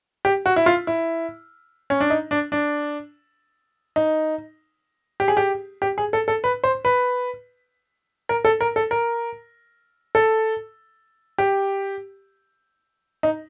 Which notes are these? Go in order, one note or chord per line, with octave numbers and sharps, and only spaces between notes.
G4
F#4
E4
F4
E4
C#4
D4
D#4
D4
D4
D#4
G4
G#4
G4
G4
G#4
A4
A4
B4
C5
B4
A#4
A4
A#4
A4
A#4
A4
G4
D#4